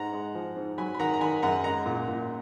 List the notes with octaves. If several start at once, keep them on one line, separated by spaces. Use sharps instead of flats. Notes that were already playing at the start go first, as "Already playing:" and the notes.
Already playing: G#2 G#3 F#5 A#5
G#3
F3
G#2
F#3 G#5 B5
B5
D#3 F#5 A#5
A#5
D#3 G#5 B5
F#2 F#5 A#5
G#3 F#5 A#5
A#2
A#2